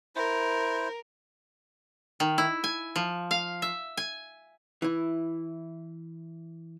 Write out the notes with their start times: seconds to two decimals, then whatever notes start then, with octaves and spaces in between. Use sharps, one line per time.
0.16 E4 A#4 C5
2.20 D#3
2.38 E4
2.64 G#5
2.96 F3
3.31 F5
3.62 E5
3.97 G#5
4.82 E3 E4